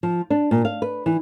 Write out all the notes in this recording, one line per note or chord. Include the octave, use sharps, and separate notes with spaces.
F3
D4
A#2
F5
B4
E3